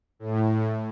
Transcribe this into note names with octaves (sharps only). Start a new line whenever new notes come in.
A2